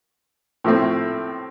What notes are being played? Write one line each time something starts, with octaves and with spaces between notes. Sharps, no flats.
A2 F3 A3 C4